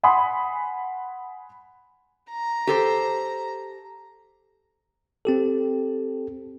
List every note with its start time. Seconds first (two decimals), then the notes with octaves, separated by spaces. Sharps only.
0.03 F#5 G#5 B5 C6 D#6
2.30 A#5
2.67 G4 A4 C5
5.25 C4 G4 A4